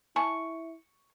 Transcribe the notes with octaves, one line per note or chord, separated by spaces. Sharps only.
E4 G#5 A5 C#6